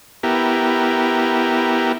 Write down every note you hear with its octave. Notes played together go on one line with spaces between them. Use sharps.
B3 E4 G4 A#4